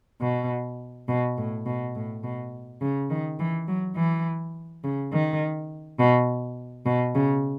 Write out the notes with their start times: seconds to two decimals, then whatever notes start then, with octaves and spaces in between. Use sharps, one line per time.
0.22 B2
1.08 B2
1.37 A2
1.66 B2
1.95 A2
2.24 B2
2.81 C#3
3.10 D#3
3.39 E3
3.68 F#3
3.97 E3
4.84 C#3
5.12 D#3
5.99 B2
6.86 B2
7.15 C#3